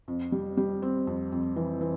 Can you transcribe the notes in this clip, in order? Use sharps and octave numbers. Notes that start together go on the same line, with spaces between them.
F2
G3
G3
C4
F2
F2
E3
E3